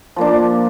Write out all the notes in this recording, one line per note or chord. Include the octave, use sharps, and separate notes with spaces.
F3 A#3 D4